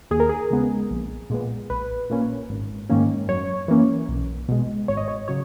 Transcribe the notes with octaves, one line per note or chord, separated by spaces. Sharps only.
D#2 G#4
A#4
G#4
C#3 G#3 B3
A#1
A#2 G#3 B3
A#1 B4
A#2 A#3 C#4
G#1
G#2 D#3 A#3 C#4
F#2 C#5
E3 A#3 C#4
B1
B2 G#3
G#1 C#5
D#5
C#5
C#3 F#3 C#5